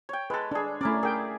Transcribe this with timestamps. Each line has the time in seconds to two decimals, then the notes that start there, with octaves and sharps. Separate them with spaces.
0.09 C#5 G5
0.30 G#3 A4 B4
0.51 D4 G#4 B5
0.81 A3 C#4 E4 A#4 D5
1.03 G#4 A#4 G5